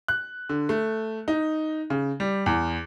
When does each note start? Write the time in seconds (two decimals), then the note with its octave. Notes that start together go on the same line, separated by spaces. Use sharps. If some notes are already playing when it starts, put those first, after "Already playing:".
0.08 F#6
0.49 D3
0.69 A3
1.28 D#4
1.90 C#3
2.20 G3
2.46 E2